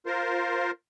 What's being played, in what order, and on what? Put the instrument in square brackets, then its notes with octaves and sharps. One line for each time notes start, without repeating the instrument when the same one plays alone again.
[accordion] F4 A#4 C5